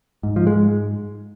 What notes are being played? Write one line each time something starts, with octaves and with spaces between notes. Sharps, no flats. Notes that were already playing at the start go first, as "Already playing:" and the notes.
G#2
F3
G#3